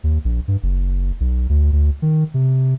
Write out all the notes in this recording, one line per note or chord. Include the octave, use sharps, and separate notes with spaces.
D#2
A#1
G2
F#1
B1
D2
D2
D#3
C3